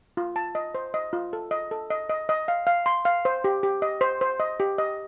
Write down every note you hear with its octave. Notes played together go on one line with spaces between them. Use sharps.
F4
A5
D#5
C5
D#5
F4
A4
D#5
A4
D#5
D#5
D#5
F5
F5
C6
F5
C5
G4
G4
D#5
C5
C5
D#5
G4
D#5